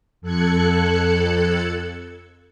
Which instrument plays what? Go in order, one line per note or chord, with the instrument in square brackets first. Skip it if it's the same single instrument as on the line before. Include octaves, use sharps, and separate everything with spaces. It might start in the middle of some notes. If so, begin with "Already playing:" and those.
[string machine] F2 A4 F#6 G#6 C#7